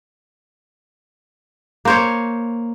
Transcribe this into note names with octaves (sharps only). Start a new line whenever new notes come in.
A#3 C5 C#5